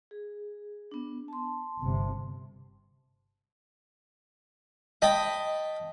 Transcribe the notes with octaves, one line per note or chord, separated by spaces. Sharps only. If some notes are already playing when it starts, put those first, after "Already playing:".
G#4
B3 D4
A5 C6
G1 C3
D#5 G5 A5 B5